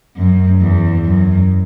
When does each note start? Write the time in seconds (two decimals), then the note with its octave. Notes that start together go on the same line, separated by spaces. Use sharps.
0.17 F#2
0.61 E2
1.05 F#2